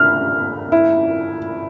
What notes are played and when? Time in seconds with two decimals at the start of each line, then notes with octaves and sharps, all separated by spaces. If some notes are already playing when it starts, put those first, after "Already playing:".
Already playing: D4 E5 F6
0.72 E4